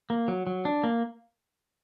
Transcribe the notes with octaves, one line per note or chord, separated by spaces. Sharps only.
A#3
F#3
F#3
D4
A#3